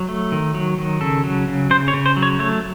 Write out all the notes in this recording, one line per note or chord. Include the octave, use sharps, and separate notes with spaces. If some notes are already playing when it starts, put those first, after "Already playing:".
Already playing: F#3
A3
D#3
F#3
D#3
C#3 A4
F#3
C#3
C#3 C5
C#5
C#3
C5
F#3
C#5
A3 C#5